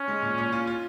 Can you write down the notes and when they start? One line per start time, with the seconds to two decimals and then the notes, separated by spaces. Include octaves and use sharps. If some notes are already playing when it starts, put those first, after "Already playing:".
Already playing: C#4
0.08 G#3
0.23 A#2
0.38 A#2
0.52 F4
0.67 F4